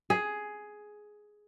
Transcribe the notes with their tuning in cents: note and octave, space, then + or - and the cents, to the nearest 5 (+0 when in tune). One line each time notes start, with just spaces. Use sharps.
G#4 +10